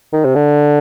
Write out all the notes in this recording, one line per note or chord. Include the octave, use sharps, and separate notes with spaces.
D#3
C3
D3